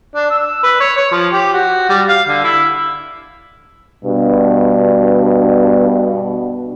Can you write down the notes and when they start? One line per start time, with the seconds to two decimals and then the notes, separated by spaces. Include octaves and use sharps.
0.15 D4
0.30 E6
0.63 B4
0.80 C#5
0.97 C#5
1.12 F3
1.32 G4
1.54 F#4
1.89 G3
2.09 F5
2.28 D3
2.44 E4
4.05 G2 B2 D4